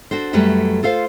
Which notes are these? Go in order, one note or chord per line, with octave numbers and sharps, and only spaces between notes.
D4 F#4 A4 C5
F#2 F#3 G3 A3 B4
F4 A4 C5 F5